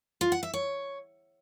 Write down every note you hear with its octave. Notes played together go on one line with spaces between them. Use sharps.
F4
F#5
E5
C#5